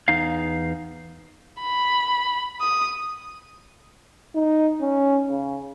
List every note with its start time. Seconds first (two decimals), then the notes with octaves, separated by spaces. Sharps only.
0.08 E2 D#4 F5
1.61 B5
2.61 D#6
4.35 D#4
4.81 C#4
5.29 C#3